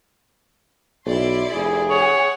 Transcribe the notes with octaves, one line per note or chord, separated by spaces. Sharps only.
B1 E4 D5 C6
F1 G#4
C#5 F#5 G#5